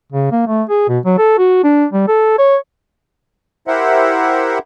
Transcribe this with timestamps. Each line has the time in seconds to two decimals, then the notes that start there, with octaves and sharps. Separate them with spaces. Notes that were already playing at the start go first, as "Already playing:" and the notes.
0.12 C#3
0.32 A#3
0.47 A3
0.69 G#4
0.89 B2
1.05 F#3
1.18 A4
1.38 F#4
1.64 D4
1.93 G3
2.08 A4
2.38 C#5
3.68 E4 G4 A#4 C5 E5 F#5